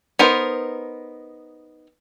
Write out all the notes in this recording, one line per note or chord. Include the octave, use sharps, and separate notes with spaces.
B3 D#4 A#4 C5